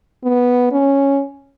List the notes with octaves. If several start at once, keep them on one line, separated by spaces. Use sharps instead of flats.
B3
C#4